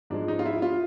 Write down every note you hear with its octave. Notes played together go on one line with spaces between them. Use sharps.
G#2 F3 G#3 D4
D#4
F4
E4
F4